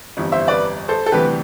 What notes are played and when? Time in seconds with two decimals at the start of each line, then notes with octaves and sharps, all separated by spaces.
0.17 G1 F2 E3 G3
0.32 C5 E5
0.48 B4 D5
0.88 A4 C5
1.06 A4
1.12 D2 C3 E3 G3 G4 B4